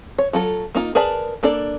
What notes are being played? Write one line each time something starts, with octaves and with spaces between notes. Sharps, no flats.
C#5
F#3 F4 A4
A#3 D#4 F4
G#4 A#4 B4 D5 A5
A#3 D4 A4 D5